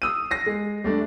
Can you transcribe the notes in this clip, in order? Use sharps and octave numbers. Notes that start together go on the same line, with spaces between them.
D#6 E6 D#7
A#6 C7
G#3
G3 A3 D4